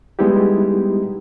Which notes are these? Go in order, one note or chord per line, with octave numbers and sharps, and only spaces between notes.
G3 G#3 B3 D#4 E4 G4